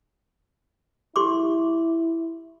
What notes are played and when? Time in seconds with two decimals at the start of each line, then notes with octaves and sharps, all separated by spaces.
1.16 E4 G4 C6 D6